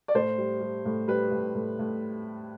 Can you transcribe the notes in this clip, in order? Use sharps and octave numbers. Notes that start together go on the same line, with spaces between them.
D5
A2 C5
G3
G3
A2
G3 B4
A2
A2
A2